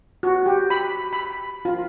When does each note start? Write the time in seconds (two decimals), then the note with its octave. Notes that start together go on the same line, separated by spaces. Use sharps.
0.23 F#4
0.46 G4
0.70 B5
1.13 B5
1.65 F4